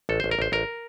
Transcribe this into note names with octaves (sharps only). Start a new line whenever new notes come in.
A1 A4
A1 C5
A#4
A1 C5
A1 A#4